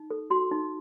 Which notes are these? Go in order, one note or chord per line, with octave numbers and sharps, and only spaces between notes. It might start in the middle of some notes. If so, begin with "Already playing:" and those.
Already playing: D#4
A4
F#4 C6
D#4